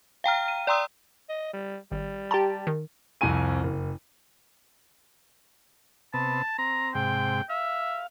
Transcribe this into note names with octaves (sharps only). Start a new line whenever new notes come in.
F5 G5 A#5 F6
D#7
D5 G5 A#5 C6 D#6 E6
D#5
G3
G#1 G3
G4 A5 A#5 C6
D#3
C2 F2 C4 G#5 D#7
F#1
C3 B3 A5
C4 A#5
G#2 C3 G5
E5 F5